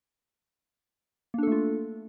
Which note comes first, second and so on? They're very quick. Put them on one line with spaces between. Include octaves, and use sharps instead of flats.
A#3 D4 A4 A3 F4